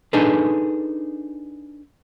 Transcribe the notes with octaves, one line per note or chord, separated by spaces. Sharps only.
D4 D#4 G#4 A4 B4